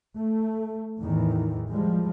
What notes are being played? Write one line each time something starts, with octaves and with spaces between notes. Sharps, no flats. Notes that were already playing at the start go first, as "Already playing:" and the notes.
A3
E2 A2 D#3 E3
F3 G3 G#3